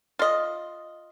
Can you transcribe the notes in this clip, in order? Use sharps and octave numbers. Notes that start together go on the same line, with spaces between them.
F4 D#5